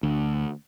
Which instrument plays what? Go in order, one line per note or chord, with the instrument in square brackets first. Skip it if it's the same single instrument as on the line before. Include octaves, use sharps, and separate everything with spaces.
[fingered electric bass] D2